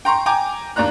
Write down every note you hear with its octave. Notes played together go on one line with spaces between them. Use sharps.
G5 A#5 C6 C#6
G5 G#5 A#5 D6
D#2 D4 A#5 F#6